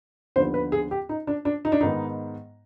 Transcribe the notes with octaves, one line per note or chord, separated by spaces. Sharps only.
D#2 D3 F3 B3 C5
B4
G#4
G4
D#4
D4
D4
D#4
D4
G#2 D#3 B3 D#4